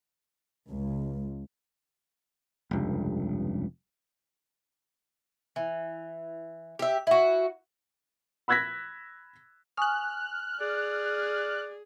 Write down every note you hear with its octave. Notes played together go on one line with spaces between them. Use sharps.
C#2
F1 C#2 G2
E3
G4 E5
E4 F#4
B5 E6 F#6 G#6 A#6 B6
G#5 C#6 D#6 F6 F#6
G#4 D5